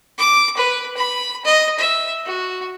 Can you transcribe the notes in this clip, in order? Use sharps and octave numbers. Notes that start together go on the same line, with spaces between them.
D6
B4
B5
D#5
E5
F#4